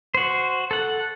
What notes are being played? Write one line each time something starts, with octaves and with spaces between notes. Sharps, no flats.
F#4 C5
A4 F#5